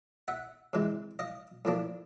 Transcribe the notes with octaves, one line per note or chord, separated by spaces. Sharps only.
E5 F#5
C3 E3 G#3
D#5 F5
A2 F3 A#3 D4